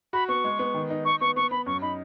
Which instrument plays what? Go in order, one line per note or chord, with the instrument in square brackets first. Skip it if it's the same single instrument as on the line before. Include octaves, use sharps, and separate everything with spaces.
[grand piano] F#4 [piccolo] B5
[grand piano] B3 [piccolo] C#6
[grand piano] G#3
B3
D#3
D#4
[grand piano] D#4 [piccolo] C#6
[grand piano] B3 [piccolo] C#6
[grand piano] B3 [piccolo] C#6
[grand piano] B3 [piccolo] B5
[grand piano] F#2 [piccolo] C#6
[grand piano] D#4 [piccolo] B5